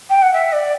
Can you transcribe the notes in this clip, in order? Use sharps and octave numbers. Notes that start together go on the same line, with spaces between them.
G5
F#5
E5
D5